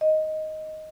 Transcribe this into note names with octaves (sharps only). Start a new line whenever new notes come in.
D#5